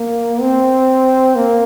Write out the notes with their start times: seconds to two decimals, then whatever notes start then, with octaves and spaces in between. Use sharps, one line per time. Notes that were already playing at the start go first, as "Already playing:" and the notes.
Already playing: A#3
0.41 C4
1.35 A#3